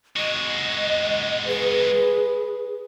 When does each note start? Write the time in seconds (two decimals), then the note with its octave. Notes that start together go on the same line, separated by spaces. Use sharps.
0.16 G#3 F#4 D#5
1.47 G#4 B4